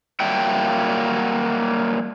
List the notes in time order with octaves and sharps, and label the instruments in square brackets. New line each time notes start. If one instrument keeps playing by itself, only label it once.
[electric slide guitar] F#3 G3 A#3 E5 G5